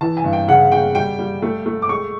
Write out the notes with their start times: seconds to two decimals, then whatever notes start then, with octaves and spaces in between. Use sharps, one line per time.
0.01 E3 A5
0.17 G#5
0.24 G2
0.33 G5
0.48 C#3 F#5
0.72 C#3 G5
0.95 G3 G5
1.19 G3
1.42 A3
1.66 A3
1.82 D6
1.89 G#3 C#6